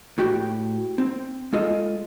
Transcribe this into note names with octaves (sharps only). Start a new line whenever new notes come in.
A2 F#4 G4 G5
C4
G#3 F4 A4 D#5